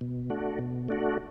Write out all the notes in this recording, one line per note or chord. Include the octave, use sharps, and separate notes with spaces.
B2
A3 D4 F#4
B2
A3 D4 F#4